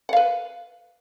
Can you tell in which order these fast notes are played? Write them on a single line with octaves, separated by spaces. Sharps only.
F#5 F5 B4